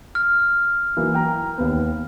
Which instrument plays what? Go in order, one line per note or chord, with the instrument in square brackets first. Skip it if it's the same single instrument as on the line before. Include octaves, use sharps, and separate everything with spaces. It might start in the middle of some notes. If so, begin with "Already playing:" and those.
[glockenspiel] F6
[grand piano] E3 F#3 A#3
G5 A#5
D#2 B3